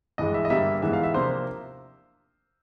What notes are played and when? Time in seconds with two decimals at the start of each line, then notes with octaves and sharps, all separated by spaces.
0.18 G2 E3 G#3 D#5
0.34 E5
0.45 D#5
0.50 G2 D3 G3 A#3 E5
0.82 G#2 E3 G#3 B3 E5
0.93 F5
1.03 E5
1.14 C3 F3 A#3 D4 C5